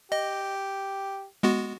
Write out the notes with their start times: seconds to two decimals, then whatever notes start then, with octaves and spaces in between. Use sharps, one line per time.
0.12 G4 D#5
1.43 G#3 B3 F#4